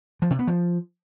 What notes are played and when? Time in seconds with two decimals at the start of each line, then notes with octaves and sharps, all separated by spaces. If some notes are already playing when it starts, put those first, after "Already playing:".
0.22 F3
0.30 C3
0.39 B3
0.47 F3